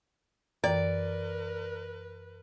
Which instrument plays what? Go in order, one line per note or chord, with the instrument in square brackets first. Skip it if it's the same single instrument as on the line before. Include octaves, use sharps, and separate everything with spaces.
[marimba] F#2 E3 G5 [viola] A#4 B4 [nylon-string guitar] D5